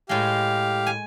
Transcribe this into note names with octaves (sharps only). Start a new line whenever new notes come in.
A2 G#3 G4 F5
G#5